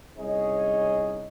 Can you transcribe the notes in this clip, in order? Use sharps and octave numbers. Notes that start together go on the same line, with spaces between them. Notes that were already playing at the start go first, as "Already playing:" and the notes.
C2 C#4 D#4 G#4 C#5 D#5